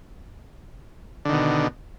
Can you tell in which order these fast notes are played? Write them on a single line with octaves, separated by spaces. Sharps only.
D3 D#3 B2